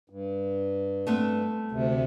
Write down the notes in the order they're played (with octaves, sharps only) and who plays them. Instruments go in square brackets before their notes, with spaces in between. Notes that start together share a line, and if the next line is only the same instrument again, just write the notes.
[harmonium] G2
[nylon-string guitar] A3 B3 C4
[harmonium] D2 C3